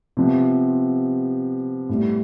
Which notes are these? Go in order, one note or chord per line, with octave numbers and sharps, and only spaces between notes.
C3 F3 B3
A2 G3 B3